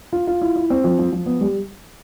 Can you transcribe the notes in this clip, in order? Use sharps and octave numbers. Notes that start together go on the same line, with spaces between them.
F4
F4
E4
E4
C4
F3
F3
F3
B3
G3